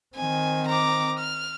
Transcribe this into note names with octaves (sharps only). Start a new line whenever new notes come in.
D#3 C4 G#5
A#5 D6
F6